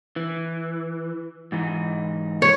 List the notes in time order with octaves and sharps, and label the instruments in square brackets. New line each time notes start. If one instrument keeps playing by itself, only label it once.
[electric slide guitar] E3
G#2 E3 D#4
[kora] C#5